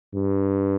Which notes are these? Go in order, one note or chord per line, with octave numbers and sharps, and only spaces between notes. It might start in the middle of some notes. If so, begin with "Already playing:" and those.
G2